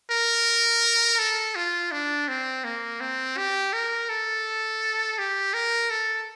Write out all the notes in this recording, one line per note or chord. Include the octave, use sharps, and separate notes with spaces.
A#4
A4
F4
D4
C4
A#3
C4
G4
A#4
A4
G4
A#4
A4